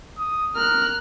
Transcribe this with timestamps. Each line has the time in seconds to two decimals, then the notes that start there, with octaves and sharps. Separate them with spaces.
0.18 D#6
0.56 A#4 F6 F#6